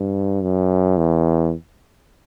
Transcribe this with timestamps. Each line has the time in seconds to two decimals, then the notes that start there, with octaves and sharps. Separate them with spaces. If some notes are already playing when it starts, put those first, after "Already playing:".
Already playing: G2
0.43 F#2
0.97 E2